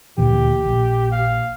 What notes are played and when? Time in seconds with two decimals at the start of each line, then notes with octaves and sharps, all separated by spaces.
0.18 D2 A#2 E3 G4
0.66 A#1
1.12 F5